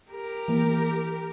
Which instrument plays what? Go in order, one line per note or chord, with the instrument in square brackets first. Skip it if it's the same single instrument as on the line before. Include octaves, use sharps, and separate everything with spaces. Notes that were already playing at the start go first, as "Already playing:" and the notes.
[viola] G4 A#4
[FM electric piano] E3 A#3